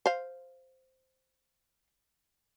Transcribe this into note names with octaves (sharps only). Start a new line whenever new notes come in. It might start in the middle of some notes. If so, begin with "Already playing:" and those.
C5 F5